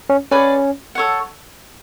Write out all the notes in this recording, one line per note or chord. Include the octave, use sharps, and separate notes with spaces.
C#4
C#4 G#4 B4 D5 F#5
A4 C#5 F#5